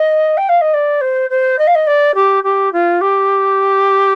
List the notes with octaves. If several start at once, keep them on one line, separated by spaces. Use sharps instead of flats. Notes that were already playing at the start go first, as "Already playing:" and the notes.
Already playing: D#5
G5
F5
D#5
D5
C5
C5
D#5
F5
D#5
D5
G4
G4
F4
G4